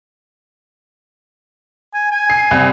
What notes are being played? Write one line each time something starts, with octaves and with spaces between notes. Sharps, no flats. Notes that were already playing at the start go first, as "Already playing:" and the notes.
G#5
G#5
C7
C2